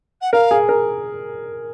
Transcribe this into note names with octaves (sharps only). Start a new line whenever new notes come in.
F#5
A#4 F5
G#4
A#4